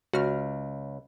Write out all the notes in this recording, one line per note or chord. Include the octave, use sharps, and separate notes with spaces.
C#2 F#4 F6